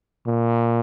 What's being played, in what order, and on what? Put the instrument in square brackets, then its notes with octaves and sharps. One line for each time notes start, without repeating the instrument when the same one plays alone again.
[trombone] A#2